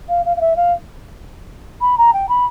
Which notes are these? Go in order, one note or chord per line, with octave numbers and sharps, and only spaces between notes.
F5
F5
F5
E5
F5
B5
A#5
G5
B5